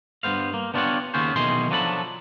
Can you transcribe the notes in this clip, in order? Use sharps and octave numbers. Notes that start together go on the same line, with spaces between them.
G2 A#2 B3 C5 F5
A#3
B3 D4 F4 G4 C#5 F#5
D#2 C#3 B3 C#4 C5
B1 B2 D#3 E3 G#4 C6
F3 F#3 D4 A4 A#4 B5